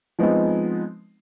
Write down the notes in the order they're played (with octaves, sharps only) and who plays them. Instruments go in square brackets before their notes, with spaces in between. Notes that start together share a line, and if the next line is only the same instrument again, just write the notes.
[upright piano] F3 G#3 B3 C4 D#4